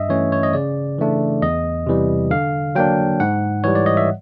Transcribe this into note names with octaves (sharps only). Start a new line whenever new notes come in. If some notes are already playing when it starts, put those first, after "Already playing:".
Already playing: G2 D#5 E5
E3 A3 C#4 C#5
C#5
D#5
C#3 D5
E3 A3 D4
E2 D#5
C3 E3 G3
D3 F5
F#3 A#3 D4 G5
G#2 F#5
E3 G3 C#5
D5
D#5
E5